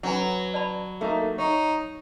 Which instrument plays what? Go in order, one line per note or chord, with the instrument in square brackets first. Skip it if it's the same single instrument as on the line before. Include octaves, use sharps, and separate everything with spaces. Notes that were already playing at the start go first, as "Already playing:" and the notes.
[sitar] F#3 [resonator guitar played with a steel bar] C#4 B4 [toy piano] C#5 G#5
[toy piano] D5 A5 B5
[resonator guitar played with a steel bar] A3 A#3 D#4
[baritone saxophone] D#4 [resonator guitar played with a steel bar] C#5